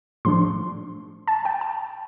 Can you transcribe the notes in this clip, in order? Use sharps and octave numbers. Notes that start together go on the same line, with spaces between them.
A2 F3 D4 C6
A5
G5
A5